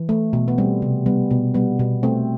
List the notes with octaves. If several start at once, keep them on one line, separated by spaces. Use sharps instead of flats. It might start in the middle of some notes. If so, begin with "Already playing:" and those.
Already playing: E3
A3
B2
B3
G3 C4
C3
G3 B3
B2
G3 B3
B2
A3 C4